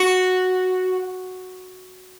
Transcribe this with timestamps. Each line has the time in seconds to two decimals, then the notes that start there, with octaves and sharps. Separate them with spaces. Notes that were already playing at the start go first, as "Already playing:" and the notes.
Already playing: F#4